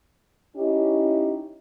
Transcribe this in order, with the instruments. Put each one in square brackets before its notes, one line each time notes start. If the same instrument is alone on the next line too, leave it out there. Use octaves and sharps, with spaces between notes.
[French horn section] C#4 D#4 E4 G4